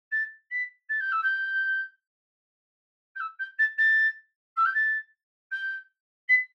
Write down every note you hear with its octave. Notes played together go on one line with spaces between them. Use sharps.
A6
B6
A6
G6
E6
G6
G6
E6
G6
A6
A6
E6
G6
A6
G6
B6